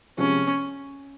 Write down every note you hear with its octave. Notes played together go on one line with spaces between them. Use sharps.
C3 F3 G#3 C#4